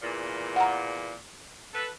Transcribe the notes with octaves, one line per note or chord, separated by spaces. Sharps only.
E2 A#2
F#5 A#5
A4 B4